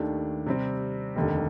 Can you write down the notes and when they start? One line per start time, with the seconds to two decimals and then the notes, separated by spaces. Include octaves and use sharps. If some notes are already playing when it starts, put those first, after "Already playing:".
Already playing: D#2 D#3 A3 D4 G4
0.46 C3 G3 C4
1.16 F1 D#2 D3